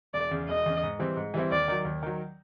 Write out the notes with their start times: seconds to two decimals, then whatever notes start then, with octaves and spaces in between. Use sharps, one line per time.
0.14 E1 D5
0.31 E2 C#3
0.49 E1 D#5
0.66 E2 C#3
0.83 G#2
0.99 E3 G3 C4 E4
1.17 G#2
1.34 E3 G3 C4 E4
1.51 D#2 D5
1.68 D#3 F#3
1.85 D#2
2.03 D#3 F#3